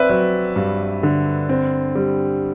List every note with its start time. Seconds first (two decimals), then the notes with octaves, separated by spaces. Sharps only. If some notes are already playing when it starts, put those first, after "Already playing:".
Already playing: C4 B4 D5 E5
0.09 F#3
0.56 G2
1.03 D3
1.49 C4
1.95 G3